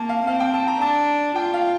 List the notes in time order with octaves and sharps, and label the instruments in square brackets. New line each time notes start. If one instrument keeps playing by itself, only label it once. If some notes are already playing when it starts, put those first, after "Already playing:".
Already playing: [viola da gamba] A#3 [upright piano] A5
[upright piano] F5
[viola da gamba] C4 [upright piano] F5
[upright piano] G5
A5
A#5
[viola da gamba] D4 [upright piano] A5
[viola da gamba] F4 [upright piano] G5
[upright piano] F5